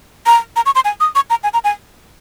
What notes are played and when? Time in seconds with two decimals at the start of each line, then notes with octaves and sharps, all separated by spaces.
0.26 A#5
0.56 A#5
0.66 C#6
0.75 C6
0.85 G#5
1.00 D#6
1.15 C#6
1.30 A#5
1.44 G#5
1.54 A#5
1.64 G#5